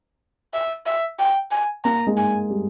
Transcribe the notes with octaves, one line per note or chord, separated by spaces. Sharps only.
E5
E5
G5
G#5
A#3 A#5
G#3
G#5
G3